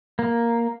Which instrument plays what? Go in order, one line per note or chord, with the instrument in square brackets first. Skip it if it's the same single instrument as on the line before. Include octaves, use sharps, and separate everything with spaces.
[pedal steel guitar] A#3